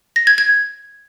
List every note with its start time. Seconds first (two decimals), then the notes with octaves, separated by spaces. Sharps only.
0.16 A#6
0.27 G#6
0.38 G#6